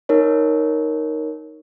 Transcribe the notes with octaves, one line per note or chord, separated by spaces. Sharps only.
D#4 A#4 C#5